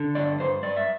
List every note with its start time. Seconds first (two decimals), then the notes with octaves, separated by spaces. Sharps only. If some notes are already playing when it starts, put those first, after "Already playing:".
Already playing: D3
0.15 G2 D5
0.40 G2 C5
0.63 G2 D5
0.77 E5